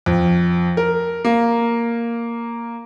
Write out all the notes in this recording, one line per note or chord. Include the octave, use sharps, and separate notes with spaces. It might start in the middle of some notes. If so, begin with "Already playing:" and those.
F2
A#4
A#3